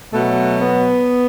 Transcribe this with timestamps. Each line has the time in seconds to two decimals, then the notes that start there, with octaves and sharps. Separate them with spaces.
0.13 B2 F#3 A3
0.61 B3